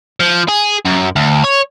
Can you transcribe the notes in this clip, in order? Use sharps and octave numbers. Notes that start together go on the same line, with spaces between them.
F3
G#4
F#2
D2
C#5